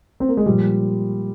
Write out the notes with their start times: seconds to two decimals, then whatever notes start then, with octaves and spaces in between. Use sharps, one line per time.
0.20 C4
0.29 A#3
0.37 G#3
0.46 A#2 F3 G3